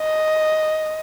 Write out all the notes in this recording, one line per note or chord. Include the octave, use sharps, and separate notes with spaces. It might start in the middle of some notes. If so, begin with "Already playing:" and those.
Already playing: D#5